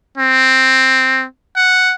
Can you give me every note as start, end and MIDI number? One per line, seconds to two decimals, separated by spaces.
0.17 1.25 60
1.56 1.95 78